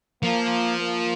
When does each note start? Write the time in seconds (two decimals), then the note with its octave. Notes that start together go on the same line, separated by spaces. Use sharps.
0.23 F3 A#3
0.79 A#3